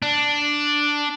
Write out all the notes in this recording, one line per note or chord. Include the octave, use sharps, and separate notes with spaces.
D4